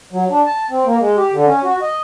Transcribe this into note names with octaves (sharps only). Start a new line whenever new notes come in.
F#3
D4
A5
C4
A#3
G#3
G4
D3
C#4
F#4
D#5